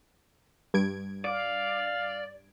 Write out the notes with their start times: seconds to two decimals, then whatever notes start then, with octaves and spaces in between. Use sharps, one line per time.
0.74 G2 G#6 D7
1.25 D5 F5